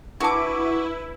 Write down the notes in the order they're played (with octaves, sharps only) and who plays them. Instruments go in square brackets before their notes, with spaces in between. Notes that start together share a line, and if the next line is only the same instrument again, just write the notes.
[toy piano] D4 A#4 A5 [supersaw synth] E4 [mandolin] F#4 D6 [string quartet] B4